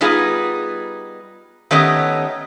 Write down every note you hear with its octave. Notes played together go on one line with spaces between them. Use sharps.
G3 B3 D#4 F4 G#4
D#3 A3 B3 C#4 G4 D#5